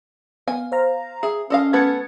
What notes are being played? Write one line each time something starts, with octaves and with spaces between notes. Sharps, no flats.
B3 F5 G#5
C5 F5 A#5
G#4 E5
C#4 A4 D#5 F5
A3 B3 B4 G#6 A6 C#7